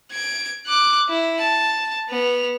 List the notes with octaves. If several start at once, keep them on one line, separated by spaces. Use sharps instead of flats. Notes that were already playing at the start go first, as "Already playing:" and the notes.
G#6 D7
D6 F#6
E4
A5
B3 F7